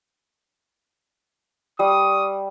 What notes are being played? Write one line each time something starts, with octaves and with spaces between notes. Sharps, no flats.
G3 C#6 D#6